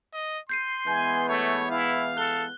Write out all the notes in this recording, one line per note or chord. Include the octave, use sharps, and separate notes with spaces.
D#5
C6 G6 C7 D#7
E3 G#3 B3 G#5 G6
A3 C#5
E4 F5
A4 F#6 G7